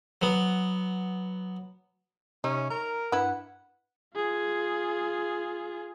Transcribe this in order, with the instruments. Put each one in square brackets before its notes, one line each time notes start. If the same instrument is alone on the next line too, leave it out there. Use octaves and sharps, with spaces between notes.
[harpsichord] F#3 B3
[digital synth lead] C3 [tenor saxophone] C#4 [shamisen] D#4
[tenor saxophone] A#4 [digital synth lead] A#5
[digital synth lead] G2 [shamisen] E4 B4 [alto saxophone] F#5
[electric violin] F4 G#4